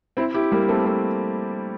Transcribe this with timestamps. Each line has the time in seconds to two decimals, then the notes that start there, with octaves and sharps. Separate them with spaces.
0.17 C4 E4
0.34 E4 G4
0.52 G3 A#3
0.68 A3 C4
0.85 A3 C4